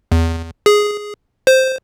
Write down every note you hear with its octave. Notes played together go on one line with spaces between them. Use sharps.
E2
G#4
C5